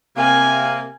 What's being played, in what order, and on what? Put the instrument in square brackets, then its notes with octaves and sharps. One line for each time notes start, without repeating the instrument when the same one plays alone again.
[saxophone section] C3 A#3 [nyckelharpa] G#5